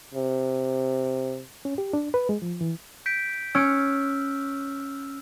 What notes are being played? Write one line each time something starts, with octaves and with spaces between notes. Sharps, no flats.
C3
C#4
G4
D4
B4
G#3
F3
E3
G6 B6 D7
C#4 E6 F6 D7